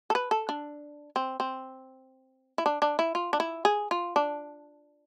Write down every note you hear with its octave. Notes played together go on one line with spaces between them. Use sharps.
A4
B4
A4
D4
C4
C4
E4
D4
D4
E4
F4
D4
E4
G#4
F4
D4